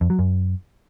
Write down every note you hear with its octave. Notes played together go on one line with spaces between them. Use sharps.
F2
F#3
F#2